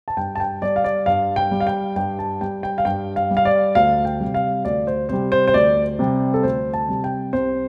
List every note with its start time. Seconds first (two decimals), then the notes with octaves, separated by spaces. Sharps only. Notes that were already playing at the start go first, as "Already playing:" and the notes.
0.08 A5
0.17 G2 G5
0.35 A5
0.40 G5
0.62 G3 D5
0.76 F5
0.84 D5
1.06 G2 F5
1.36 G5
1.51 G3
1.60 F5
1.67 G5
1.96 G2 G5
2.19 A5
2.41 G3 G5
2.63 G5
2.78 F5
2.85 G2 G5
3.16 F5
3.31 G3
3.37 F5
3.45 D5
3.75 D2 F5
4.05 G5
4.20 C3 G3
4.34 F5
4.65 D2 D5
4.87 C5
5.09 C3 G3 C5
5.32 C5
5.48 C5
5.54 D2 D5
5.99 C3 G3
6.34 A4
6.43 D2 C5
6.73 A5
6.89 C3 G3
7.04 G5
7.33 C2 C5